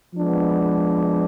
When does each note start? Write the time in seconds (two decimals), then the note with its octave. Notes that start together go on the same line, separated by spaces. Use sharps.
0.14 F3 G#3 B3 D4